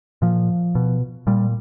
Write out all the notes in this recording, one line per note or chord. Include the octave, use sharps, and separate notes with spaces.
A#2 F3
B2
A#2 G3